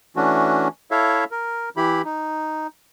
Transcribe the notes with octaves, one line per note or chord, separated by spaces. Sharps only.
E3 A3 C#4 D4 F#4
E4 A4 C#5 E5 F5
A#4
E3 E4 G4 B5
D#4